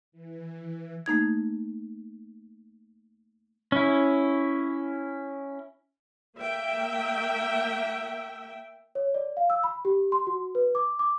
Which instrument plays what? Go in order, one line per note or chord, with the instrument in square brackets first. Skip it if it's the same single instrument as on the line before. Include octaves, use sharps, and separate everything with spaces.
[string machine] E3
[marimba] A3 A#3 D#4 G#6
[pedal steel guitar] C#4 E4
[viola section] A#3 E5 G5
[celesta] C#5
D5
F5
E6
B5
G4
C6
F#4
B4
D6
D6